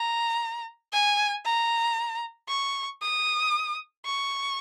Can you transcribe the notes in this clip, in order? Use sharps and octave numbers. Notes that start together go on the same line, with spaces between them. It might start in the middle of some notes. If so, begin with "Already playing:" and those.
Already playing: A#5
G#5
A#5
C#6
D#6
C#6